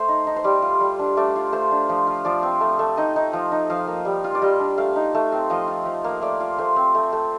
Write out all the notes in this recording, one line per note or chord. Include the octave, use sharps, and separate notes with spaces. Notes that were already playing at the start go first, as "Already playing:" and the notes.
Already playing: A3 C5
D#4
D#4
C5
G3 D5
F4
G3
D4
A3 D5
F4
A3 C5
D4
F3
F4
F3 D5
C4
A3
A3
D#4 D#5
D#4
F3
D#4
F3 F5
A#3
G3
F4
D5
G3 D#5
D4
A3 F5
D#4
A3
C4
F3 D#5
F4
F3
A#3
A3 D5
F4
A3 C5
C4
A3
A3